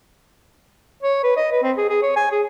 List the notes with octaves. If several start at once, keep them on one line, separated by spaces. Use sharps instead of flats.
C#5
B4
D#5
B4
C4
G#4
G#4
C#5
G#5
G#4